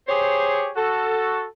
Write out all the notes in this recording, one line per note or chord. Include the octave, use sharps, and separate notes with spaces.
G4 G#4 C5 C#5
F#4 A4